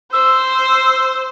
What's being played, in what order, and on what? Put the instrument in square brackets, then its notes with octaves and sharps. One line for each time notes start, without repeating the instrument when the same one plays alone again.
[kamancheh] C5 [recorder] E6